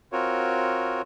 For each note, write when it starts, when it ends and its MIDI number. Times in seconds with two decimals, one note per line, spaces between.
0.12 1.02 60
0.12 1.02 65
0.12 1.02 66
0.12 1.02 70
0.12 1.02 73